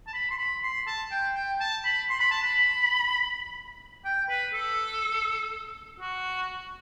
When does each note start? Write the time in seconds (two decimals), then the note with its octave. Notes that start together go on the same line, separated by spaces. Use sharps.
0.07 A5
0.13 B5
0.31 C6
0.38 B5
0.63 C6
0.87 A5
1.11 G5
1.35 G5
1.60 A5
1.84 B5
2.10 C6
2.20 B5
2.31 A5
2.42 B5
4.05 G5
4.29 B4
4.53 A4
6.00 F#4